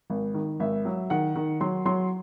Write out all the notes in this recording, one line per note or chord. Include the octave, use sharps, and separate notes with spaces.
G#1
D#3
G#1 E5
F#3
D#3 F#5
D#3
F#3 C6
F#3 C6